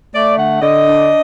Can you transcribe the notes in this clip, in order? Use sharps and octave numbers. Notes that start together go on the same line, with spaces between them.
A3 D5
D3 F#5
D3 D#5
D4